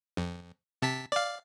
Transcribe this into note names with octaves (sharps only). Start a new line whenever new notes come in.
F2
C3 A5 B6
D5 F5